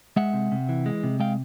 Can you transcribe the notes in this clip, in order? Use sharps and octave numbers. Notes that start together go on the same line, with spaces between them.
G#3 E5 F#5
C3
C3
E3
G#3
C3
G#3 F5 G5